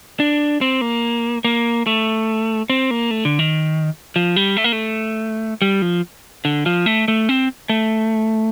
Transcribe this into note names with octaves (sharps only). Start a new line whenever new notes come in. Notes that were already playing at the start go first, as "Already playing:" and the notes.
D4
C4
A#3
A#3
A3
C4
A#3
A3
D3
D#3
F3
G3
A3
A#3
A3
G3
F3
D3
F3
A3
A3
C4
A3